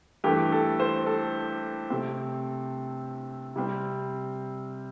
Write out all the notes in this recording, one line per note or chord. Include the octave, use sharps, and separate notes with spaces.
G2 E3 A3 G4
A4
C5
A4
C3 A3 C4
C3 G3 C4